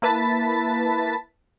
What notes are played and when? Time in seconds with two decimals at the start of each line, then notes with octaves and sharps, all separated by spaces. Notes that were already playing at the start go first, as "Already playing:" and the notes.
0.02 A#3 E4 B4 A5 A6 B6